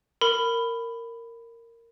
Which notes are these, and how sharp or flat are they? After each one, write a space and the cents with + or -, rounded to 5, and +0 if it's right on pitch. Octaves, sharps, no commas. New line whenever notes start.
A#4 -15 B5 +10